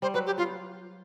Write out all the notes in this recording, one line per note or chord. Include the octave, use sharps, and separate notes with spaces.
G3 C5
F#3 B4
G4
B3 F4